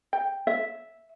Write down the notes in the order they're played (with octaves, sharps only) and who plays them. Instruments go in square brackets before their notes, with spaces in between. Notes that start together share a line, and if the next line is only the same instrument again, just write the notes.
[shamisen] G5
[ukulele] E5